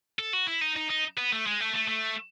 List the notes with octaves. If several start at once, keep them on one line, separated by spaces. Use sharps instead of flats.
A4
F#4
E4
D#4
D#4
D#4
B3
A3
G#3
A3
A3
A3